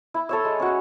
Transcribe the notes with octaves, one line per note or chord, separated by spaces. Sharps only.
E4
A4 C#5 E5
G#3
C#4 F#4